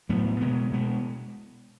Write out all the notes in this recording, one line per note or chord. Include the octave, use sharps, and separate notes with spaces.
A2 F#3 B3
B2 G#3 B3
B2 G#3 B3